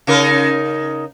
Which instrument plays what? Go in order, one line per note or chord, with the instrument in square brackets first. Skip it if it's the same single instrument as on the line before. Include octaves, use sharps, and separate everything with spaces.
[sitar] C#3 D#4 A#4